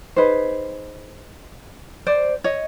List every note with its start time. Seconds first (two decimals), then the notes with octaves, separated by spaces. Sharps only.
0.16 D#4 G#4 B4 C5
2.07 C5 D5
2.44 C#5 D#5